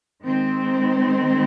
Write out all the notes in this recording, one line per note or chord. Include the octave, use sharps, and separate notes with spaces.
D#3 G#3 C4